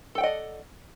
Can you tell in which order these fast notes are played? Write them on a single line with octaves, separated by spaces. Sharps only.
A4 G5 F#5 D#5 D5